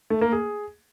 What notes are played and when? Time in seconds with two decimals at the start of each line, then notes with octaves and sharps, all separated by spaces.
0.10 A3
0.21 A#3
0.32 G#4